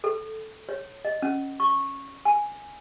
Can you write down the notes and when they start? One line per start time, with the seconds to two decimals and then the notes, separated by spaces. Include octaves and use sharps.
0.04 A4
0.69 C#5
1.05 D#5
1.22 C#4
1.60 C#6
2.25 G#5